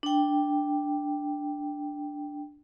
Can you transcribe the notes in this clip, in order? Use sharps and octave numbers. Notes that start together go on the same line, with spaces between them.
D4 G5